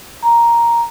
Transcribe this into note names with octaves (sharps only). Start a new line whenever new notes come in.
A#5